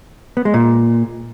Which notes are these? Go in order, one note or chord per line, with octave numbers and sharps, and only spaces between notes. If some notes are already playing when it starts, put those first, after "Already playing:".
B3
G#3
A#2